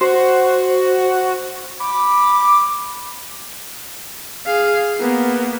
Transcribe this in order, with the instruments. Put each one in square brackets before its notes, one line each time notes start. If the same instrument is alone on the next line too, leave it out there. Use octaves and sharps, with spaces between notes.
[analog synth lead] F#4 [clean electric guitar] C5
[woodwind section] B5 D6
[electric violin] G#4 F5
A#3 B3